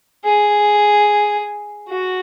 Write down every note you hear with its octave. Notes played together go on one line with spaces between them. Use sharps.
G#4
F#4